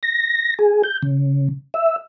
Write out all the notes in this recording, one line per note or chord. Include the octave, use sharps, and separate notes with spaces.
A#6
G#4
G6
C#3
E5